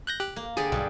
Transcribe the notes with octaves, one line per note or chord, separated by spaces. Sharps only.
F#6 G6 A#6
G4 F#6
A#3
D3 G4 G#4 D5 G#5
B1 G2